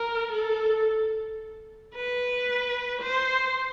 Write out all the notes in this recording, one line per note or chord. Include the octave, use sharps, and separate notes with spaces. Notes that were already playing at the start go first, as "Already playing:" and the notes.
Already playing: A#4
A4
B4
C5